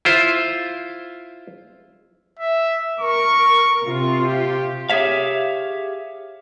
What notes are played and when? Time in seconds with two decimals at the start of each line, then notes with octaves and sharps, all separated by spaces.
0.05 E4 F4 C5
2.39 E5
3.00 A#4 C#6
3.84 C3 F4
4.24 G4
4.90 G4 G#4 C#5 E5 F5